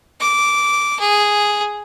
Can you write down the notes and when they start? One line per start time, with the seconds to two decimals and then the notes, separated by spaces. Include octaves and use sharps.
0.20 D6
0.99 G#4